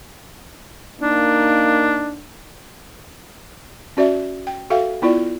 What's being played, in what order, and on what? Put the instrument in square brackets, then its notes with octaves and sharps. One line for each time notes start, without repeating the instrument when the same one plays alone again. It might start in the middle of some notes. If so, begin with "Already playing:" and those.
[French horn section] A#3 D#4 [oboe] D4
[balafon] C#4 F#4 D5 E5
G5
F#4 A4 E5 F5 G5
B3 E4 F4 D5